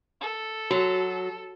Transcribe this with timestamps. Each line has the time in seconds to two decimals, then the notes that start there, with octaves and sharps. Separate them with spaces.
0.21 A4
0.71 F#3 F#4